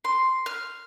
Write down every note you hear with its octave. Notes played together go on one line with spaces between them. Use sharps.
C6
F6